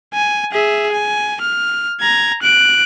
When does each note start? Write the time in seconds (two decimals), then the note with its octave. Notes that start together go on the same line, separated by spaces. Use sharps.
0.14 G#5
0.52 G#4 E5
0.92 G#5
1.41 F6
2.00 A#5 G#6
2.42 F#6 D7